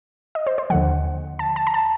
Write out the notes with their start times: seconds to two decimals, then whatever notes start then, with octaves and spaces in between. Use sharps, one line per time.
0.35 D#5
0.47 C5
0.58 C5
0.70 D#2 D3 F3 F#5
1.39 A5
1.56 A5
1.67 A#5
1.74 A5